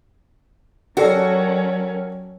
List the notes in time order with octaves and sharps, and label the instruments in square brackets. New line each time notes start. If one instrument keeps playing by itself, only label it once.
[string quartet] F#3 C#4 [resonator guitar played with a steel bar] F#4 [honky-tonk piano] G4 A4 D5 [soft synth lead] A#4